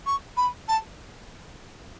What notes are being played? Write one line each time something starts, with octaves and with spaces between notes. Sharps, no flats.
C#6
B5
A5